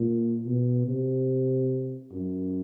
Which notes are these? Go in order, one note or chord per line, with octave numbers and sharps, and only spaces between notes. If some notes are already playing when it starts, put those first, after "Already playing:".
Already playing: A#2
B2
C3
F#2